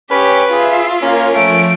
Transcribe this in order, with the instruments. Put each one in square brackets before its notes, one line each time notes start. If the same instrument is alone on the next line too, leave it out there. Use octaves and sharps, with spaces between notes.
[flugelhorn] C#4 [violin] G4 [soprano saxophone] B4
[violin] F4 [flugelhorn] G#4 [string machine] E5 C7
[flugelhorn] A#3 [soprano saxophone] C#4 [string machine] A#4 C#5
[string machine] F3 [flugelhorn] A3 [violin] D7